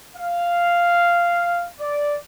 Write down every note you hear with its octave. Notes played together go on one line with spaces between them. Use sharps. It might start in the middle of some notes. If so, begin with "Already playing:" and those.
F5
D5